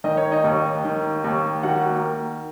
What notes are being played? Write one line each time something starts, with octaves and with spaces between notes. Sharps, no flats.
D#3 D#5
C#5
D#4 D#5
D#2
D#3
D#2
D#3 F#4 F#5
A#3 A#4